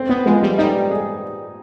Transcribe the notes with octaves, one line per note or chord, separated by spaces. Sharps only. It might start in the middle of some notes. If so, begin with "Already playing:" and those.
Already playing: C4
B3
F3 G#3
G3
G3 D#4
G#4